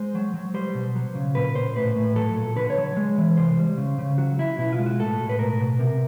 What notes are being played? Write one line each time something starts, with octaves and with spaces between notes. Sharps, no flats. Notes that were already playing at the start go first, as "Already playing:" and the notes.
Already playing: G#3 C5
F#3
F#3
G3 C5
B2
F#3
C#3
A#2 B4
A#2 C5
A2 B4
A2
F#3 A4
A#2
D3 B4
C#5
F#3
G#3
E3
C3 C5
G3
C#3
C#3
F#3 F#4
F#3 E4
B2 E4
F4
G#3
F#4
A2 A4
A2
B4
B2 A#4
B2
C3